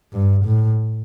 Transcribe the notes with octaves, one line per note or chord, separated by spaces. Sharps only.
G2
A2